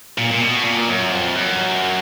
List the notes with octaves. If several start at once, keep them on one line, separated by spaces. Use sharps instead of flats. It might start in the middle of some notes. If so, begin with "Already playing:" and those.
A#2
A#2
B2
A#2
F#2
F2
F#2